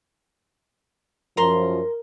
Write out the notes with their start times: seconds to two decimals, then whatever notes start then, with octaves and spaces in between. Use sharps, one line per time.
1.37 F#2 F3 A#4 A#5 C6